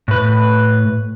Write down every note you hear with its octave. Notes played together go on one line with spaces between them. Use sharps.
A2 B4